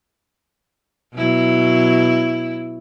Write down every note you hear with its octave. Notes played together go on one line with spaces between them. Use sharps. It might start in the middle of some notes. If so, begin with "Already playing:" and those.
B2 F#3 E4